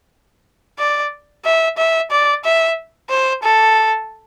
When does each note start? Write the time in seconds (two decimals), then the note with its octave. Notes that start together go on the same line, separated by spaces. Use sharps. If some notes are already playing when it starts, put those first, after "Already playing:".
0.79 D5
1.45 E5
1.77 E5
2.11 D5
2.44 E5
3.10 C5
3.43 A4